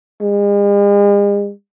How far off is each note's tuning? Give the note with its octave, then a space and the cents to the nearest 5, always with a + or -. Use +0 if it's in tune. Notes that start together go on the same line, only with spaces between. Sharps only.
G#3 -45